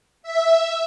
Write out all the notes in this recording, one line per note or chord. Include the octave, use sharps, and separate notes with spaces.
E5